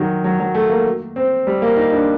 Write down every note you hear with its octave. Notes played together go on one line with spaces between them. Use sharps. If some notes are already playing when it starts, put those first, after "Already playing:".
Already playing: D#3 F#3
F#3
F#3
A3
A#3
C4
G3
A#3
D#4
D4